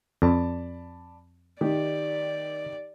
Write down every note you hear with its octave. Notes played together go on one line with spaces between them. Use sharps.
F2 D5 A5 B5
D#3 G4 D5